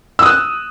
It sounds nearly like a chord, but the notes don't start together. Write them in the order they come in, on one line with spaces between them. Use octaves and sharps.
E6 D#6 F#6